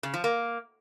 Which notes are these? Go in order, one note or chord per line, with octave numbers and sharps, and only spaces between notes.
C#3
F3
A#3